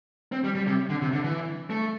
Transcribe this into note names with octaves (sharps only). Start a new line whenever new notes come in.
C4
G3
G3
C3
D3
C3
D3
E3
A3